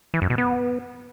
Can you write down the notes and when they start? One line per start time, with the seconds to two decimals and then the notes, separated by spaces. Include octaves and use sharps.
0.14 E3
0.22 F#2
0.30 B2
0.38 B3